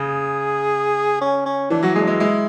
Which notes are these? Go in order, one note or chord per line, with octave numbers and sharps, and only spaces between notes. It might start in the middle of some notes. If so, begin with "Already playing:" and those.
Already playing: C#3 G#4
C#4
C#4
E3 D4
F#3 F#4
G#3 G#4
D4
G#3 E4
G#3 E4